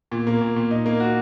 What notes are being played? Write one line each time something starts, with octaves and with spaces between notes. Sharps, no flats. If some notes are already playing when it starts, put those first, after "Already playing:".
A#2
A#3
A#2
A#2
D#4
A#3
F#4